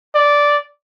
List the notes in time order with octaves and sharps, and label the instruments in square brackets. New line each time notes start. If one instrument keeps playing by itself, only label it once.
[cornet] D5